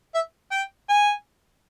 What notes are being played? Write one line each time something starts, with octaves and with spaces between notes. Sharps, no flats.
E5
G5
G#5